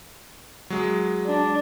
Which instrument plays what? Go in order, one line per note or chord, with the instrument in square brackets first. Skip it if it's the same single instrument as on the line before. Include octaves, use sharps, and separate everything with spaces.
[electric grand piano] F#3 G#3
[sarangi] D4